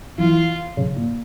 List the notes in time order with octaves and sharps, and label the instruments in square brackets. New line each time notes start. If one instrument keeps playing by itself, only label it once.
[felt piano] E3 [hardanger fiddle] F4
[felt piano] C#3
A#2